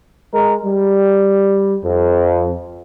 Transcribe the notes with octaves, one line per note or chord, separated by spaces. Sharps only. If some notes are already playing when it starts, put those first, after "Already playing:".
G#3 A#4
G3
F2